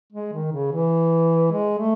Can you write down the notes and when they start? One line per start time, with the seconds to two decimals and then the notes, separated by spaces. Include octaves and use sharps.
0.13 G#3
0.33 D#3
0.52 C#3
0.72 E3
1.52 G#3
1.79 A3